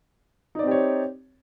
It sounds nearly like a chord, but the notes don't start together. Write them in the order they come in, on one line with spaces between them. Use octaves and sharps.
D#4 D5 C4 G4 C#5